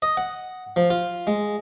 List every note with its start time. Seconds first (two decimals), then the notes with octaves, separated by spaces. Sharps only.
0.02 D#5
0.17 F#5
0.76 F3
0.90 F4
1.27 G#3